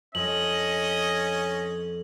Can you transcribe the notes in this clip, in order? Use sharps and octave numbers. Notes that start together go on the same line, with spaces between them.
F2 C#4 D#5 F#7